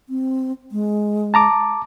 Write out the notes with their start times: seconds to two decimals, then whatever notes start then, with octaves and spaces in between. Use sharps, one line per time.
0.09 C4
0.72 G#3
1.34 A5 A#5 D6